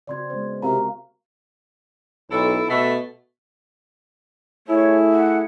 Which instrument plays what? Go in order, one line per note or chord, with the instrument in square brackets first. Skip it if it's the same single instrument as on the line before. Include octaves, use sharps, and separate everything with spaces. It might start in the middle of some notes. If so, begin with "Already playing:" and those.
[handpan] C#3 C4 F#4 [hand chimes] D5 C6 G#6
[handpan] G#3 B3 C4 [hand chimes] C5
[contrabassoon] C3 [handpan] F#4 A#4 F5 [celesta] A#5
[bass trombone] B1 [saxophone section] E4 A4
[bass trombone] B2 [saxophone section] A3 A4
[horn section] A3 E4 G#4 [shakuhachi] C#5
[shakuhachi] F#5